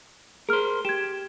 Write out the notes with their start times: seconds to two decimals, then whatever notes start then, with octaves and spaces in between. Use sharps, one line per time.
0.49 G#4 A#4 C5 F6
0.85 G4 G#6 E7